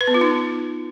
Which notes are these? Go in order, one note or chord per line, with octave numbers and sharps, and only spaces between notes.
B4
B3
F4
D#4